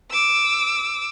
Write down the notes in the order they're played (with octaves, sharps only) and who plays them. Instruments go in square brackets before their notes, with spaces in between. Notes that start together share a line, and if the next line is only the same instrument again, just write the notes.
[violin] D6 E6